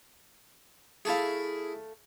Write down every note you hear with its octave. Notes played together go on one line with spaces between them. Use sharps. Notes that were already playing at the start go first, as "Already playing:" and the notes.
A3 E4 G#4 A4 F5